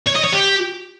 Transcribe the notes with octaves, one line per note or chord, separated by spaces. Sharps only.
C#5
D#5
C#5
G4